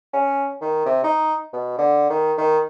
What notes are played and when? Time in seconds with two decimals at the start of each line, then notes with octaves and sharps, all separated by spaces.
0.13 C#4
0.61 D#3
0.86 C3
1.04 D#4
1.53 B2
1.78 D3
2.10 D#3
2.38 D#3